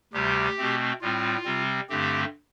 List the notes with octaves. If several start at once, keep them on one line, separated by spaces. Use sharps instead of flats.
D2 C3 G3 G4
B2 A3 C4
A2 G3 C4 F4
C3 G3 C4
G2 D3 A3 C4 G4